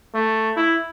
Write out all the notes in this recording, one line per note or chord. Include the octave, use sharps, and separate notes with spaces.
A3
E4